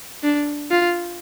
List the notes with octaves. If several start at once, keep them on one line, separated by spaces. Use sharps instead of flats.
D4
F4